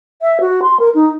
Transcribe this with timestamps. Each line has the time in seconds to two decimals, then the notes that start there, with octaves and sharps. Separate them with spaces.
0.22 E5
0.40 F#4
0.62 C6
0.79 A#4
0.94 D#4